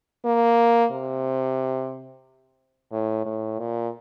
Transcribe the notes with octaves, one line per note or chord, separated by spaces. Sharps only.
A#3
C3
A2
A2
A#2